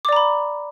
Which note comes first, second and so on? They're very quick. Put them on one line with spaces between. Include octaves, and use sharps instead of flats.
D6 D5 A#5 B5